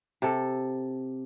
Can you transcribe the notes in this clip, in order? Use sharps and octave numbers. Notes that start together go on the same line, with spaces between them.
C3 A4